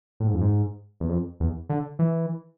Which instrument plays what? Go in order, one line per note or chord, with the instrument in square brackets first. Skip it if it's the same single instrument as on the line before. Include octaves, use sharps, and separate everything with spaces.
[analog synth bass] A2
G#2
F2
G#2
E2
F2
E2
D3
E3